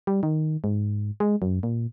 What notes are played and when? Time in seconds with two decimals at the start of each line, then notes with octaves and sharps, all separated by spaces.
0.07 G3
0.23 D#3
0.64 G#2
1.20 G#3
1.42 F#2
1.63 A#2